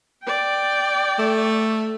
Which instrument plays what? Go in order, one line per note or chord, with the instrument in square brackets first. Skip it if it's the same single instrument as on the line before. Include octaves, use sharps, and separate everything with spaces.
[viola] D5 G5
[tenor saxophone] A3